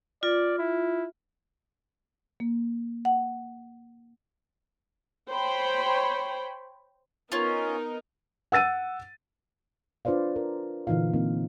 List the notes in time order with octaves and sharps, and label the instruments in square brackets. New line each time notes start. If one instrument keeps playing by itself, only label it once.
[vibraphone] F4 [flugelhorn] D5
[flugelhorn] E4
[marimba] A#3
F#5
[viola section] C5 C#5 G5 B5
[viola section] B3 D#4 A#4 [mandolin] C#4 F4
[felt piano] F#5 E6 A6 D#7
[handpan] D4 F4 B4 C5 D5 F5
A#4
A#2 D3 E3 D#4 F4 F5
A#3 C4 D#4